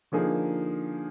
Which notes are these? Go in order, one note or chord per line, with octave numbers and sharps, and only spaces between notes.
D3 F3 A#3 D#4 G#4